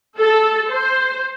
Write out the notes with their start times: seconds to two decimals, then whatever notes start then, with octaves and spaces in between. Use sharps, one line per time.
0.19 A4
0.69 C5